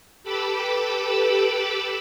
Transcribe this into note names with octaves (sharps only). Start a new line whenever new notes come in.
G4 A4 B4 B5 D6 E6